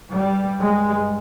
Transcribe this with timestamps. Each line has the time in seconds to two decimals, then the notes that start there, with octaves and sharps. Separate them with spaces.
0.12 G2 G3
0.60 G#3